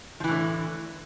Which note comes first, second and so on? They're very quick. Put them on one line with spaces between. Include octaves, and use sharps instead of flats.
F3 E3 A2 D3